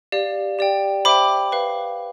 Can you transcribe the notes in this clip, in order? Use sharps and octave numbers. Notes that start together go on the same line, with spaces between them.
G4 D5 F5
G4 D5 G5
C5 E5 G5 B5 D6
B4 F5